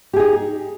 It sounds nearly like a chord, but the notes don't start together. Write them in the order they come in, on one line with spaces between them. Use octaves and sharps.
G4 G#4 D#4